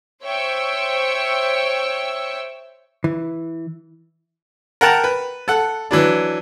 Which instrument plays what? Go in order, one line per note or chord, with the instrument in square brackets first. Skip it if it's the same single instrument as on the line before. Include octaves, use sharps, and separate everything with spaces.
[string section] C5 C#5 E5 G5 C#6 E6
[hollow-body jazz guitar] E3
[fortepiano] A#4 F#5 G5 A5 A#5
B4
A4 F#5
E3 F#3 D4